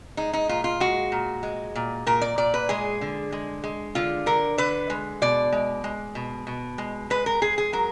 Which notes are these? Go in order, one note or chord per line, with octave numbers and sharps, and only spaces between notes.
G#3 D#4
D#4
A#2 F4
F4
G#3 F#4
A#2
G#3
A#2
A#2 A#4
D5
A#2 D5
B4
G#3 G#4
D3
G#3
G#3
D3 F4
D3 A#4
D3 B4
G#3
B2 D5
G#3
G#3
B2
B2
G#3
G#3 B4
A#4
G#3 G#4
G#4
F#3 A#4